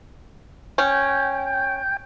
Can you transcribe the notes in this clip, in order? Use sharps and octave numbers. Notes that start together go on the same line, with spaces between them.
C#4 G5